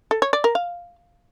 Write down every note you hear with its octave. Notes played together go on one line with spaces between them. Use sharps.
A4
C#5
D5
A#4
F5